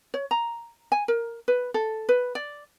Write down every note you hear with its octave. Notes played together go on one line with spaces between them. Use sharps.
C#5
A#5
G#5
A#4
B4
A4
B4
D5